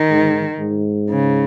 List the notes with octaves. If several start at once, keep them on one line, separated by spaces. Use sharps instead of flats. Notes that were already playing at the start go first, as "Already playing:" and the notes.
Already playing: D#3
G#2
G#2
C#3